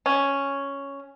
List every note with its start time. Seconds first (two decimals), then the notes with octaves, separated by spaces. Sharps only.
0.06 C#4